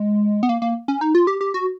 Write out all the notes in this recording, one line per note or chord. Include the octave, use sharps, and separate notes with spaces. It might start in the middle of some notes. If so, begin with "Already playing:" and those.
Already playing: G#3
B3
A#3
A#3
C#4
D#4
F4
G4
G4
F#4